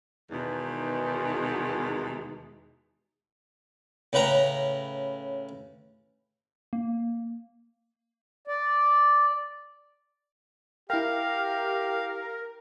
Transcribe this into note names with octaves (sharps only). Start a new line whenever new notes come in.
E2 B2 D#3 G#3 D#4
A2 C#3 B4 A#5
A#3
D5
E4 G4 A#4 F5 G5